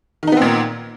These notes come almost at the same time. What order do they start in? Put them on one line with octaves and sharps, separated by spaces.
D#3 D#4 B3 C4 A#2